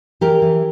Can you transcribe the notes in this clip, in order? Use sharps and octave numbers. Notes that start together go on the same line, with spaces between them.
E3 G4 A#4
E3